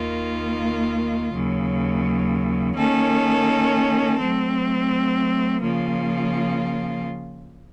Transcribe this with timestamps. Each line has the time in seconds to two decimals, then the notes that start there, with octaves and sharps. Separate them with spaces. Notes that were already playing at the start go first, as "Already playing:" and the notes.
Already playing: D#2 D#3 A#3 F4
1.32 D#2 C#3 F#3
2.75 D#3 A#3 C#4 A4
4.18 F#3 A3 C4
5.61 C#3 F3 A#3 F4